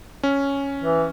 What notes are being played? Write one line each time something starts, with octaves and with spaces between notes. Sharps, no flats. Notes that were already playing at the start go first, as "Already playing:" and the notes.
C#4
E3